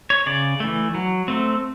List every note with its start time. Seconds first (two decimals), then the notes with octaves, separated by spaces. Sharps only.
0.10 C#5
0.26 C#3 D5
0.60 E3 A3
0.95 F#3
1.28 A3 C4